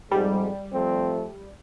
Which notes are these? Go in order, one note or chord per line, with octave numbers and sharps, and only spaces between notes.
F2 G#2 G3
F3 A3 C4